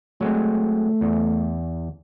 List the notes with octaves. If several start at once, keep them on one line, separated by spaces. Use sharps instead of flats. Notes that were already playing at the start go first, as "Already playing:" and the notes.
F#3 G#3 A3 C4
E2